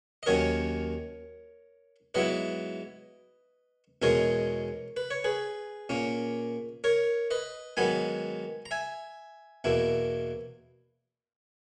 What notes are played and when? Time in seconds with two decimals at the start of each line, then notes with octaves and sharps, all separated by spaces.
0.23 D#5
0.26 D#2 D#3 F#3 C#4 A#4 C#5
2.14 G#2 F#3 B3 E4 B4 D#5
4.02 E2 B2 G#3 D#4 A#4 C#5
4.97 B4
5.11 C#5
5.24 G#4 B4
5.89 A#2 A#3 C#4
6.84 A#4 C#5
7.31 B4 D#5
7.77 G#2 D#3 F#3 B3 D#4 G#5 B5
8.66 A#5
8.71 E5 G#5
9.64 E2 B2 A#3 E4